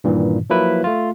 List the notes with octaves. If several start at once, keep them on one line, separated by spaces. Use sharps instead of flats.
G2 A#2 D#3 E3
F3 F#3 A#3 E4 B4
A3 F4